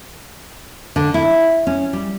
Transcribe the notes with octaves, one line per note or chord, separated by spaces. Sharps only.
D3
E4
C#4
G3